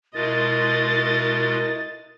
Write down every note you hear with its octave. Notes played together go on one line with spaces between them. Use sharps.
B2 G#3 E4 F4 A#4 D#5 A6